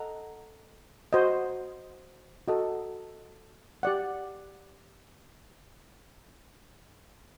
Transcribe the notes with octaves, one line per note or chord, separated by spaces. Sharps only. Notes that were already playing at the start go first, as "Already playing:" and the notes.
Already playing: A4 D#5 F#5 A#5
F#4 C5 D#5
F#4 A4 D#5
G4 D5 F#5